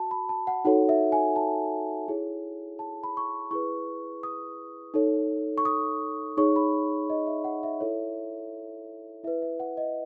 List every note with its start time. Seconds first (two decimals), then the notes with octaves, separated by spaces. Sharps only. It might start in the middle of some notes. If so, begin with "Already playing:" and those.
Already playing: F#4 A5
0.11 B5
0.29 A5
0.47 F#5
0.65 D#4 F#4 A4 C#5 F#5
0.89 E5
1.12 G#5
1.36 A5
2.08 E4 G#4 C#5
2.79 A5
3.04 B5
3.17 C#6
3.27 B5
3.51 E4 G#4 B4 C#6
4.23 D#6
4.94 D#4 A4 C#5
5.58 C#6
5.65 D#6
6.37 D#4 G#4 C#5 C#6
6.56 B5
7.10 D#5
7.27 E5
7.44 F#5
7.63 E5
7.80 E4 A4 C#5
9.24 E4 E5
9.27 B4
9.42 E5
9.60 F#5
9.77 D#5